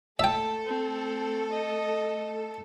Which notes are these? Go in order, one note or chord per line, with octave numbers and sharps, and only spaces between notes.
A3 A4 E5 G5 A5
C4
D#5